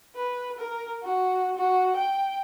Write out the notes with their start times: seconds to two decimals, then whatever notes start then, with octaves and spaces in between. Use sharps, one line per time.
0.15 B4
0.58 A#4
1.03 F#4
1.57 F#4
1.96 G5